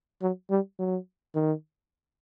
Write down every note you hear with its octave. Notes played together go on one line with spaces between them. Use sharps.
F#3
G3
F#3
D#3